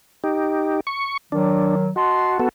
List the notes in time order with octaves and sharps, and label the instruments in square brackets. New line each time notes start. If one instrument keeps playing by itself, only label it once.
[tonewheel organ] D#4 G4
C#6
[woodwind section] D#3 F#3 [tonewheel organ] D4
[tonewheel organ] F#4 [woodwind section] D#5 A5 C6
[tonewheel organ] B3 F#4 A4